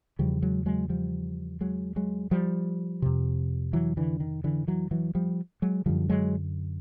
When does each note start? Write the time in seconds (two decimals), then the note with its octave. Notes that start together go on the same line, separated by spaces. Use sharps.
0.19 E2 C#3 F3 G3
0.42 F#3 G#3
0.66 F#3 G#3
0.89 F3 G3
1.61 F#3 G#3
1.96 F#3 G#3
2.31 F3 G3
3.02 F2 C3
3.73 E3 F#3
3.97 D3 E3
4.20 D#3
4.44 D3 E3
4.67 E3 F#3
4.91 E3 F#3
5.15 F3 G3
5.62 F#3 G#3
5.86 F#2 D3 F3 G3
6.09 F#3 G#3